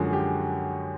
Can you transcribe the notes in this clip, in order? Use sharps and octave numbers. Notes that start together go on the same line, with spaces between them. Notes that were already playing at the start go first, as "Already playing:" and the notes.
Already playing: F#2 D3 F3 G#3 F#4
G4